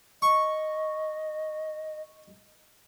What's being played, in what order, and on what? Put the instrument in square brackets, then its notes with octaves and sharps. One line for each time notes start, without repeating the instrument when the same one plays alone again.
[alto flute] D#5 [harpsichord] C#6